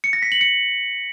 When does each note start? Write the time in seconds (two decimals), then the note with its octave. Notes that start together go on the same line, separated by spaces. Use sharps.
0.04 C#7
0.13 A#6
0.22 B6
0.32 F#7
0.41 C#7